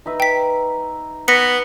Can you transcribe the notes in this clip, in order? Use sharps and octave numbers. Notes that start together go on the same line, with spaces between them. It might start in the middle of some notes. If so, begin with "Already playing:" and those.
D#4 B4 E5
G5 B6
B3 A#6 B6 C#7